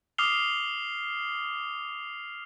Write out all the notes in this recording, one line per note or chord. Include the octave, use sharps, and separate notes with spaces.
D6 D#6 F6 C7 F7 G7